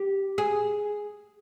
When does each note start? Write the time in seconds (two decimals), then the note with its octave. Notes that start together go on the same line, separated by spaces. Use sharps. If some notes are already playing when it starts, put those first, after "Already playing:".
Already playing: G4
0.38 G#4